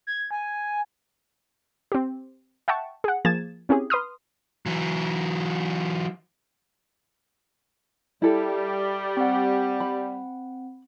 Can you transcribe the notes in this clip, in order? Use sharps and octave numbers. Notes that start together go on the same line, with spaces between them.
G#6
G#5
C4 G4
E5 F#5 G5 A5 C#6
G#4 F#5
F3 A#3 G#4 G#6 A6 E7
C4 C#4 E4 G4 G#4
B4 C6 D#6 F6
E3 F#3
G3 E4 A4
C4 F#5
B5